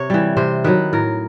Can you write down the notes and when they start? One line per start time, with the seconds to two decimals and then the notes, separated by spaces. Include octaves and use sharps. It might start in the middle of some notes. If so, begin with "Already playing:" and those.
Already playing: C3 C#5
0.10 E3 G3
0.37 C3 C5
0.64 D#3 F#3 B4
0.93 A2 A#4